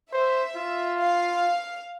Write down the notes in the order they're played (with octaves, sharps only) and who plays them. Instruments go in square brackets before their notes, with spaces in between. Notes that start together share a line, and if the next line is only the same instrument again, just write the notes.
[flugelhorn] C5 [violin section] E5
[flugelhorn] F4
[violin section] F5